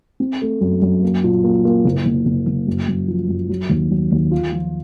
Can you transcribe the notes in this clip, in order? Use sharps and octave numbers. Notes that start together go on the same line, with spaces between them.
C4
A3
F#2
F#2
A#3
A#2
A#3
A#3
F#1
F#1
F#1
F#1
F#2
F#2
F3
F#2
F#3
D#2
F#3
D#2
F4
F3